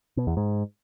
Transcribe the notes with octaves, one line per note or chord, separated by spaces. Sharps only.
B2
E2
G#2